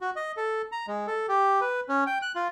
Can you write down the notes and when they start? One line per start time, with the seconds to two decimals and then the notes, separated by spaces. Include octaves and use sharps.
0.01 F#4
0.16 D#5
0.37 A4
0.72 A#5
0.88 G#3
1.07 A4
1.29 G4
1.61 B4
1.89 C#4
2.07 G5
2.22 F#6
2.35 F4